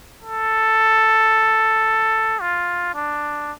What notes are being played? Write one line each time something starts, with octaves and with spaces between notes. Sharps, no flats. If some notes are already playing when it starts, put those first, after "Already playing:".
A4
F4
D4